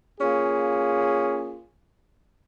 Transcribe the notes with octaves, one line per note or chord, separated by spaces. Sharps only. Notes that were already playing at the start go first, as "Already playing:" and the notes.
A#3 C#4 F4 G#4